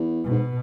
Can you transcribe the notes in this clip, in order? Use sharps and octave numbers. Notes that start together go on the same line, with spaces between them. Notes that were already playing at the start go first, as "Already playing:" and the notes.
Already playing: E2
B2
G#2